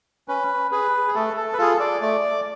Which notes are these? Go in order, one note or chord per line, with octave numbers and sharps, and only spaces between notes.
C#4 B4
G#4 B4
G#4
A3 A4
A4
B4
F4 G#4 A4
D5
A3 D5